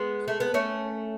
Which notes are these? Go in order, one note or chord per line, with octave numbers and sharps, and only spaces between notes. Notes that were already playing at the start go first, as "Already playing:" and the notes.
Already playing: G#3 B3
A3
B3
A3 C#4